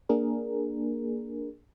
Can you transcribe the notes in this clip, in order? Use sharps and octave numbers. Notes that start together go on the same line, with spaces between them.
A#3 D4 G#4 A#4